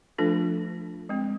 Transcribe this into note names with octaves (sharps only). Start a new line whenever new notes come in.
F3 A3 D4 F4 A4
G#3 C4